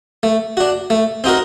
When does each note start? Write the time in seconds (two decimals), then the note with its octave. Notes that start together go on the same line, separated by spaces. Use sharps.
0.23 A3
0.57 D4 F#4
0.90 A3
1.24 C4 D#4 F#4 A#4